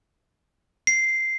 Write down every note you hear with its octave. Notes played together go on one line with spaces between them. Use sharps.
C7